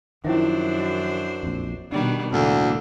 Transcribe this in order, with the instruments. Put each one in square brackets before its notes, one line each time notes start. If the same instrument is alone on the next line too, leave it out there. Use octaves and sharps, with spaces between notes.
[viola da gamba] F#2 D4 C5 [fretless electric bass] D#3 F3 [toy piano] C#4 E4 E5
[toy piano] F#4 D#5
[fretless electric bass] A#1 F2
[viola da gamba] B2 D#3 G3 [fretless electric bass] D4
[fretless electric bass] E1 A2 D4 [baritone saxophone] D2 [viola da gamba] D3 A#3